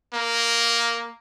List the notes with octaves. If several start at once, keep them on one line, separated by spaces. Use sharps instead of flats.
A#3